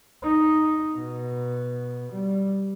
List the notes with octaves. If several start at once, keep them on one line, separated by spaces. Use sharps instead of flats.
D#4
B2
G3